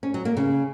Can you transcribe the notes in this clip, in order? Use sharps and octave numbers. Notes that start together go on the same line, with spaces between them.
C#4
F#3
A#3
C#3